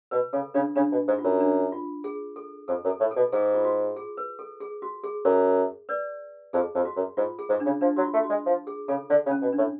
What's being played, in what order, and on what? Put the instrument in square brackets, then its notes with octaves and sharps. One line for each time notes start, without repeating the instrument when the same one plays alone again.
[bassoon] B2 [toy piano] B4
[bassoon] C#3 [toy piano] A4
[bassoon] C#3 [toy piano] D4
[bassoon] C#3 [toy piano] D4
[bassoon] B2
G#2
[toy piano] F4
[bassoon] F#2
[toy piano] D4
F4
G#4
A4
[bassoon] F2 [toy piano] A4
[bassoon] F#2
[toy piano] A4
[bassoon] A2
[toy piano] A4
[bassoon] B2
[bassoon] G#2 [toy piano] G#4
[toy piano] F4
F#4
G#4
B4
A4
G#4
F#4
G#4
[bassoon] F#2
[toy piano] B4 D5
[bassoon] F2 [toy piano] G#4
[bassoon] F2
[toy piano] F#4
[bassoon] F#2
[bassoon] G#2 [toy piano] F4
[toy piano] G#4
[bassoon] G#2
[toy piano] D4
[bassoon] C#3
[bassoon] F3 [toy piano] D4
[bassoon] F#3 [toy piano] F#4
[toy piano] F4
[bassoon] A3
[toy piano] F#4
[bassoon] G#3
F3
[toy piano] G#4
[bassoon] C#3 [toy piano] A4
[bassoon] D3
C#3
[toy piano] C#4
[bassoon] B2
[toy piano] D4
[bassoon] A2